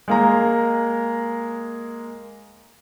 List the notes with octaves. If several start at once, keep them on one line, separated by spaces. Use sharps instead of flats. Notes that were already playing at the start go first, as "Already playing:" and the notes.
G#3 A#3 A#5